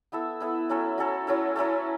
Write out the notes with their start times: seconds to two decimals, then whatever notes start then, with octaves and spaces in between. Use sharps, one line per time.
0.12 B3 E4 A4 E5
0.40 B3 E4 A4 E5
0.69 F#3 C#4 E4 A4
0.98 F#3 C#4 E4 A4
1.27 F#3 C#4 E4 A4
1.56 F#3 C#4 E4 A4